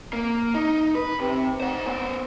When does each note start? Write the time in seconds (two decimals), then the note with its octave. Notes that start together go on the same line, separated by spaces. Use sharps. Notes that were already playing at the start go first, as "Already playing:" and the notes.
0.13 A#3
0.55 D#4
0.95 B4
1.20 C3
1.60 C5 F#5
1.86 B3 C5